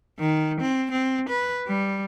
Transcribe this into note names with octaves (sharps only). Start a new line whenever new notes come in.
D#3
C4
C4
B4
G3